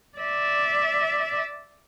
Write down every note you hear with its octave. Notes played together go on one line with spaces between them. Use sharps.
D5 E5